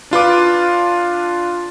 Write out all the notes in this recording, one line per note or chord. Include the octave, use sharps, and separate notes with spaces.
D4 F4 B4 D6